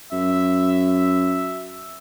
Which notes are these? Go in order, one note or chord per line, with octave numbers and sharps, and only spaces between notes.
F#2 E5